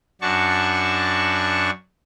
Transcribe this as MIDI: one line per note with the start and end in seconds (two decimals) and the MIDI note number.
0.21 1.70 42
0.21 1.70 62
0.21 1.70 66
0.21 1.70 81
0.21 1.70 85